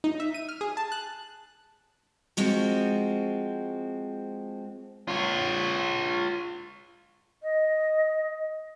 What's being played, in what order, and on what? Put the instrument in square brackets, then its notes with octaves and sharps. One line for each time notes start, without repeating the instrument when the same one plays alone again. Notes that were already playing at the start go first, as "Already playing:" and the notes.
[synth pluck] D#4
E5
D#7
F6
G#4
A5
F#6
[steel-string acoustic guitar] F3 G#3 C4 F#4
[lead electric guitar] F4 C#5
[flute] D#5